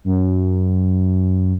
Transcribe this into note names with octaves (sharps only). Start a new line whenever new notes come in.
F#2